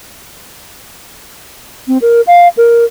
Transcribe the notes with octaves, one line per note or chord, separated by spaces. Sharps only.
C4
A#4
F5
A#4